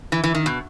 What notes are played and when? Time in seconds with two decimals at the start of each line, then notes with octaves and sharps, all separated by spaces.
0.12 E3
0.24 E3
0.35 D#3
0.46 B2